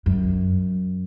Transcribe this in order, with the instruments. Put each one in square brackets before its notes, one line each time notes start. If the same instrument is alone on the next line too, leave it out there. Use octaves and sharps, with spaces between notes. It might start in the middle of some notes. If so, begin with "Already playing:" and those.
[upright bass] F#2